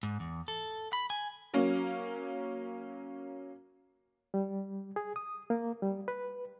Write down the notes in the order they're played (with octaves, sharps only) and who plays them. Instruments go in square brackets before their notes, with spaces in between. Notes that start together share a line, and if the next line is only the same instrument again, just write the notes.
[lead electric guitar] G#2
E2
A4
B5
G#5
[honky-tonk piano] F#3 A#3 C#4
[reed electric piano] G3
G#4
D#6
A#3
G3
B4